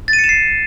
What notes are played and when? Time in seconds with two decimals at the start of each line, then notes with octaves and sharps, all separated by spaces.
0.08 A6
0.13 D#7
0.19 C#7
0.24 E7
0.29 C7